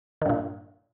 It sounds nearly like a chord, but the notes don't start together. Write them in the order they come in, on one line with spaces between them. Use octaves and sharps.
D#3 G2 A#2